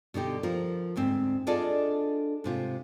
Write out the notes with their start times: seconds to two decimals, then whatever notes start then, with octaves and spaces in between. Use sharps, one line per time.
0.14 B2 D3 D#4 G4
0.43 F3 F4 A#4
0.96 D2 G#2 C4
1.47 D4 F4 G#4 A4 D5 D#5
2.44 G#2 C3 F4